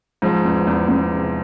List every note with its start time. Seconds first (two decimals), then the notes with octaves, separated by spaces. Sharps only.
0.22 G#2 F3
0.45 E2
0.67 E2
0.88 E2
1.11 C3